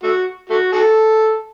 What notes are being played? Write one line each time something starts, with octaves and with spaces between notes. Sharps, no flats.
A3 F#4
A3 F#4
F#4 A4